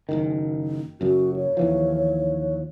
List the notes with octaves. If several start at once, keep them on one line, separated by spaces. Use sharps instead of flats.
F#1 C2 D#3
F#1 F#2 F#4
C#5
D#2 E3 F3